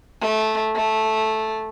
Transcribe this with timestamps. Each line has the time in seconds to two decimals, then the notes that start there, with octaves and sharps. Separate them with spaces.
0.21 A3
0.76 A3